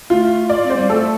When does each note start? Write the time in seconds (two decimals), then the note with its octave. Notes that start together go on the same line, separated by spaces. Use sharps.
0.10 A3 F4
0.50 D5
0.63 C4
0.70 C5
0.76 G3
0.89 A3 A4